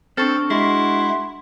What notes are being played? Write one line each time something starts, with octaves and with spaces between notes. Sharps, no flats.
C4 D4 A4 C#6 F6
G#3 E4 F#4 C6